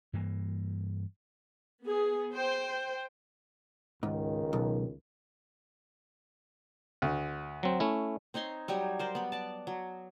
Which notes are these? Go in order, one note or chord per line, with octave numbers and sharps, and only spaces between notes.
G2 E3 A#3
B3 G#4
C5 G5
C#2 G#2 D#3
B1
D2
F#3 C4
A3 C#4 E4
C4 D#4 C#5 C6
F#3 G3 G4 C#5
A#4 C5 D5
B3 B5
D5 A5
F#3